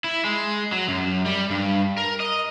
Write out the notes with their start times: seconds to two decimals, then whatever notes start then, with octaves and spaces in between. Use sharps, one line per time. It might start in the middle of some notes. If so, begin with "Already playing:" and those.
0.04 E4
0.25 G#3
0.72 F#3
0.88 F#2
1.26 G3
1.51 G2
1.97 A#4
2.20 D#5